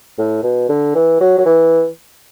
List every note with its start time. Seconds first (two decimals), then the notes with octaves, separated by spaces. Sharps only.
0.18 A2
0.43 B2
0.69 D3
0.95 E3
1.21 F#3
1.38 F#3
1.45 E3